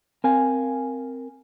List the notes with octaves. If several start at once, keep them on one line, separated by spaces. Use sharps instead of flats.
C4 A#4 F5 G#5